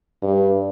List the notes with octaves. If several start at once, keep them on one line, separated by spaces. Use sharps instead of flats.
G2